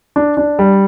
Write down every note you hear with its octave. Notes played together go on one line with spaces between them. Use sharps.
D4
D4
G3